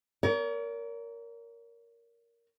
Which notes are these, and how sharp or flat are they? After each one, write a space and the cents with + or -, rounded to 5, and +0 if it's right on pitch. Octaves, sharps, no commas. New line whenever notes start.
A#4 +0 C#5 +45